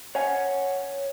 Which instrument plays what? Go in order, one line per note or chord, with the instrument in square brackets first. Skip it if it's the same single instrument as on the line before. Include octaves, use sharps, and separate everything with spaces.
[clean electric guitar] C#5 F#5 G#5